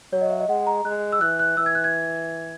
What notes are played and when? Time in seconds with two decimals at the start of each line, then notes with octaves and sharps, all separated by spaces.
0.12 F#3 C#5
0.21 D#5
0.30 E5
0.40 D#5
0.48 G#3 F#5
0.67 A#5
0.85 G#3 F#6
1.12 E6
1.21 E3 F#6
1.39 F#6
1.57 E3 E6
1.66 G#6
1.75 F#6
1.84 G#6